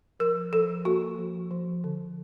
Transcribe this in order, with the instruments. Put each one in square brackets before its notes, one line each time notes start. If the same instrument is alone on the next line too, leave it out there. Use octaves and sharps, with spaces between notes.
[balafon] F3 A#4
F3 A4
A#3 F#4
F3
F3
D3